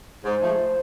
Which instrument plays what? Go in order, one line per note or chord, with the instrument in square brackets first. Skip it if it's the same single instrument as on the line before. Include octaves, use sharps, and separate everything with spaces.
[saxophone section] G#2 [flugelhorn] C5
[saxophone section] F3 A3